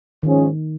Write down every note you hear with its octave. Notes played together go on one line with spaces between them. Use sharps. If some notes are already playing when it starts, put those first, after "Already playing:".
G#2 D#3 F3 C#4 G#4